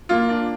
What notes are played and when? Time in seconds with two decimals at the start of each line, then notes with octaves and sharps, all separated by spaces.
0.09 A#3 F4
0.29 D4